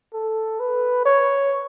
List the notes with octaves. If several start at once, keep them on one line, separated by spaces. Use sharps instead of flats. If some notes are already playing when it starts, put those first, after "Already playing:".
A4
B4
C#5